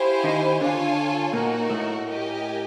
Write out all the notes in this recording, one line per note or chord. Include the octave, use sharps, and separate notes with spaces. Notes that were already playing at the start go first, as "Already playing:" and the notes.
Already playing: E4 G4 C5 F5 G#5
D#3 D#4
D3 D4 F4 A4 C#5 F5 G#5
A#2 A#3 D#4 F#4 A#4
A2 A3
G4 A#4 D#5 G#5